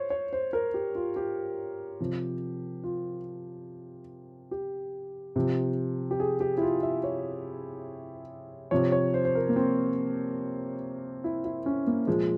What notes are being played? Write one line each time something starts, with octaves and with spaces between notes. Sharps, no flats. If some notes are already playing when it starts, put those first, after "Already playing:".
Already playing: C5 C#5
C#5
C5
A#4
G4
F4
G4
C3 F3
F4
G4
C3 F3
G4
G#4
G4
E4
F4
E5
C#5
C3 F3 C#5
C#5
C5
C5
A#4
A#3
C4
E4
E4
C#4
A#3
A#2 F3 G#3